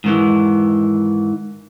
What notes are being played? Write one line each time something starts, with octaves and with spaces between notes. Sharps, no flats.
G#2 D#3 E3